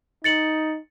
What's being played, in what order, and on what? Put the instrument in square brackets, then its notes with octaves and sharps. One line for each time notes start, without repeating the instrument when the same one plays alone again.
[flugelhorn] D#4 [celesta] A6 C#7 F#7